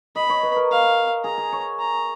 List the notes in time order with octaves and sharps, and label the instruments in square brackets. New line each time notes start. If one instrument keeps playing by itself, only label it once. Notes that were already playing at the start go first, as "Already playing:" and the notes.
[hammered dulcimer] D#5 [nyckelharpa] B5
[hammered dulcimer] C#5
B4
A#4
[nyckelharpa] F5
[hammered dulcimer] G#4 [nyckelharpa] A#5
[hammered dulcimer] G#4
C#5
[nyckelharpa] A#5